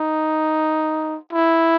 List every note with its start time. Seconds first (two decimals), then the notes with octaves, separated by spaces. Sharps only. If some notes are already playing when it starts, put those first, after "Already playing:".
Already playing: D#4
1.33 E4